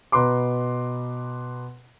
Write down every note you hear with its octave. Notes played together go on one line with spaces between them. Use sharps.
B2 B4 A#5 C6 D6